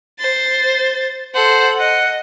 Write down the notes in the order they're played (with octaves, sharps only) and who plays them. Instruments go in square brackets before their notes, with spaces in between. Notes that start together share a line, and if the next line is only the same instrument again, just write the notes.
[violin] C5 A6
[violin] A4 F#5 [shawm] C5
[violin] D#5 [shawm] F#5